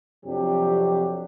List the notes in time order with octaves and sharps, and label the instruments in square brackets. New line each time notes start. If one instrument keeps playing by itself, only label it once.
[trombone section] F2 C3 F#3 D4 G4